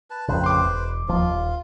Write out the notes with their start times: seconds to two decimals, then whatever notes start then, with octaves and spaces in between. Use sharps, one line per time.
0.10 B4 A5
0.28 A1 F2 C#3 B4 C5
0.44 C6 D6
0.59 E1
1.08 E1 D#2 F3 F4
1.29 D#1